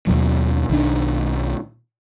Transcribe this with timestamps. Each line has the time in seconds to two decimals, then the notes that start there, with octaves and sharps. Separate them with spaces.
0.07 D#2 B2 F#3
0.70 B1 D#3 E3 D4